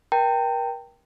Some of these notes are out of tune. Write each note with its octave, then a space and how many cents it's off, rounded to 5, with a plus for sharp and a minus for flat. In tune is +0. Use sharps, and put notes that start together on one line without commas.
A#4 +35 G5 +0 A#5 -45